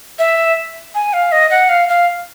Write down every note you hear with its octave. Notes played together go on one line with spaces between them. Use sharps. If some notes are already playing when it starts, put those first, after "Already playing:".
E5
G#5
F5
D#5
F#5
F5
F5